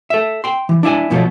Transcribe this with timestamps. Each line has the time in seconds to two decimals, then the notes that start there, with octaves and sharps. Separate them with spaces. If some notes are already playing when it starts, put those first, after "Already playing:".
0.10 A4 E5
0.44 G5 C6
0.69 E3
0.83 D4 E4 E5 G#5
1.10 B1 B2 F3 F#3 A3